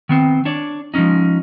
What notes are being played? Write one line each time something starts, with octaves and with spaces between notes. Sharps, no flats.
D#3 B3 C4
D4 C#5 D5
F3 G#3 A3 C#4 D#4